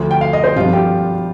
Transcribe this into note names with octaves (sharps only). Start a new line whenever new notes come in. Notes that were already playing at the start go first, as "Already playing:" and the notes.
Already playing: D2 D3 F3
G5
F5
D#5
C5
G#1 G2 F3 F4
G4